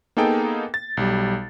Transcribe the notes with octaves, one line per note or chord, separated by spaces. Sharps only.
A#3 B3 D#4 G#4 A4 G5
A6
B1 G3